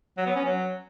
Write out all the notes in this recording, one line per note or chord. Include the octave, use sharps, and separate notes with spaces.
F#3
B3
C#4
F#3